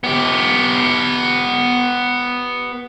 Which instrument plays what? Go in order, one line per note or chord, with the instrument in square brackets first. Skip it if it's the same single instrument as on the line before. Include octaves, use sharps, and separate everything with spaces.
[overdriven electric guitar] B3 G4